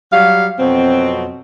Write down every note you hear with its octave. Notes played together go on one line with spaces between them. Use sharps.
F#3 G3 F5
F2 B2 F#3 C4